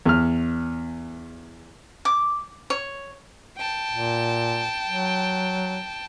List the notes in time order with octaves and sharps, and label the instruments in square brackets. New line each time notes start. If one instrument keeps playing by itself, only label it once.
[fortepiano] E2 F6
[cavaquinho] D6
C#5
[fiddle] G5 A5
[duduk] A#2
F#3